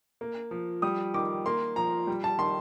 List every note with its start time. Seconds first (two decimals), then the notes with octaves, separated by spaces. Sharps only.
0.21 A#3
0.51 F3
0.82 G3 D#6
1.14 D#3 D6
1.46 A#3 C6
1.76 F3 A#5
2.07 G3
2.24 A5
2.39 D#3 C6